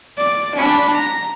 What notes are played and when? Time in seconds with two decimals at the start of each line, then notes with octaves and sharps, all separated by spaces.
0.18 D5
0.55 D4 B5
0.94 A#5